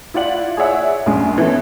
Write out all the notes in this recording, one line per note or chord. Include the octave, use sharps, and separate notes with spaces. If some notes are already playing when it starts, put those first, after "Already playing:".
E4 F4 D5 F#5 F#7
G#4 C#5 D5 E5 F#5
A#1 F#2 G#3
E3 A3 B3 C#4